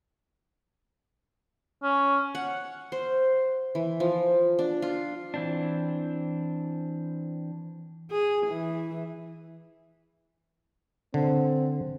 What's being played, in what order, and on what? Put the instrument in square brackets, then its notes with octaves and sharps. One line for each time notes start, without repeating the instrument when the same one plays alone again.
[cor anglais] C#4
[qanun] F#5
C5
E3
F3
D4
F4
[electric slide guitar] E3 C4 D4
[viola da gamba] G#4
E3
[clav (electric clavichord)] D3 [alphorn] C4